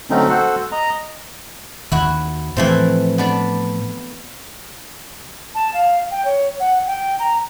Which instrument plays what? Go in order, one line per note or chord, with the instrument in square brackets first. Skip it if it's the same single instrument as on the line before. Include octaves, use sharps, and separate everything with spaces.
[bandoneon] D3 F#3 A3 C4 C#4 D#4
F#4 A4 C5 F#5
D#5 A#5
[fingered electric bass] D#2 D#3 [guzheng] E4 F#4
[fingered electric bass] A2 F3 [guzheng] E3 A3 C4
[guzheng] B3 D4 D5
[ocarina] A5
F5
G5
C#5
F#5
G5
A#5